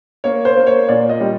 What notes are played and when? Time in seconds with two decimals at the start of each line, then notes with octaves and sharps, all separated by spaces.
0.24 A#3 C#5
0.45 C5
0.57 A#3
0.67 C#5
0.88 A#2 D5
1.09 D#5
1.21 G3